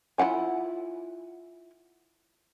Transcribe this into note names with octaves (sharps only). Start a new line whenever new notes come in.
E4 F4 F#5 G#5